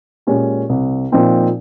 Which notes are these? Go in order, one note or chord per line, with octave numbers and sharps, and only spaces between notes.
A#2 G#3 C#4 G4
C2
A#2 F3 C4 D#4